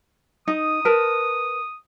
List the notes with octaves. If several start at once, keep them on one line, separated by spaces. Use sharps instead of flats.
D#4 D#6
A#4 B4 A5